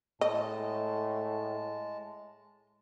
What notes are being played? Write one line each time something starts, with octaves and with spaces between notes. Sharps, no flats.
A2 G#3 D#5 A5